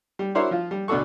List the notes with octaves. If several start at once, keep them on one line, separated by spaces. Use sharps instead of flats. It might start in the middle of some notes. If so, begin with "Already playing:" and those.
G3
D4 E4 F#4 A#4 C5 C#5
F3 F4
G3
D2 B2 D4 F#4 A4 C#6